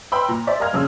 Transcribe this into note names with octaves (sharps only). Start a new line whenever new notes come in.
B4 G5 B5 C6 E6
A#2 A#5
C5 D5 E5
A#4 D#5 F5 A#5 F6 G#6
A#1 C#3 E6